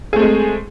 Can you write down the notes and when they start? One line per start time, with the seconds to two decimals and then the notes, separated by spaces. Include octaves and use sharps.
0.13 G#4
0.16 A3
0.19 C4
0.22 G#3